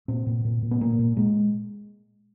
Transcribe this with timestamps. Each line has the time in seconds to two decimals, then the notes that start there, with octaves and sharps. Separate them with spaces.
0.08 A#2 C4
0.26 A#2
0.45 A#2
0.62 A#2
0.71 B3
0.81 A#2 A#3
0.99 A#2
1.17 A#2 G#3